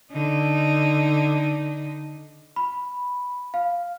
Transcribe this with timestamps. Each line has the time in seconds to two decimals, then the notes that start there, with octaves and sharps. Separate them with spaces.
0.12 D3 D#4
2.56 B5
3.54 F5